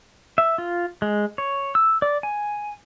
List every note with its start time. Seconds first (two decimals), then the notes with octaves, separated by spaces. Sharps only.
0.38 E5
0.58 F4
1.02 G#3
1.38 C#5
1.75 E6
2.02 D5
2.23 G#5